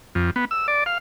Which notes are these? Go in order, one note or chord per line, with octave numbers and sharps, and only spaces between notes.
F2
B3
E6
D5
F5